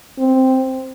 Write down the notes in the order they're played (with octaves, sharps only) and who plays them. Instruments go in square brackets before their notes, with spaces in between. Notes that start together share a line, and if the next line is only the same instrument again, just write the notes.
[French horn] C4